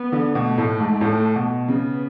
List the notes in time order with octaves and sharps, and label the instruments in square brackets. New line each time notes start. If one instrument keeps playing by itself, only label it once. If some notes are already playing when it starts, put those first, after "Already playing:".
Already playing: [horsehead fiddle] B3
[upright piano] D3
[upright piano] B2 [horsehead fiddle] A3
[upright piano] A2
G#2
A2
B2
[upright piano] C#3 [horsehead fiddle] B3